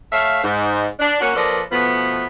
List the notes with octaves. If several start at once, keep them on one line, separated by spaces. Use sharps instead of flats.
A3 C#5 E5 F5
G#2
D4
A#3 C#4 F#4
F3 A#3 A4 B4 D5 D#5
B2 F3 A3 B3